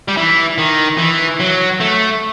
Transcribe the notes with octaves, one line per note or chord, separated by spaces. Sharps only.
G3
E3
D#3
E3
F#3
A3